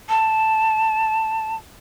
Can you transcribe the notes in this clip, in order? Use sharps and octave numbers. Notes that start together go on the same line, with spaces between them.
A5